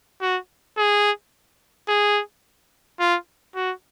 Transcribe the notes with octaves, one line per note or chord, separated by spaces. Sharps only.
F#4
G#4
G#4
F4
F#4